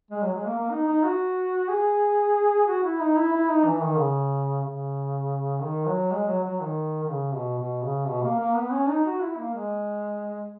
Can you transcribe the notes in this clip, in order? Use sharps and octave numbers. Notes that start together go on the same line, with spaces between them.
G#3
F#3
G#3
A#3
A#3
D#4
D#4
F#4
G#4
F#4
E4
D#4
E4
E4
D#4
E3
D#3
C#3
C#3
D#3
F#3
G#3
F#3
F#3
D#3
D#3
C#3
B2
B2
C#3
B2
A#3
A#3
B3
C#4
D#4
F#4
E4
A#3
G#3